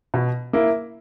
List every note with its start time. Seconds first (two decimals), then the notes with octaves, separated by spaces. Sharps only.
0.14 B2
0.53 A#3 E4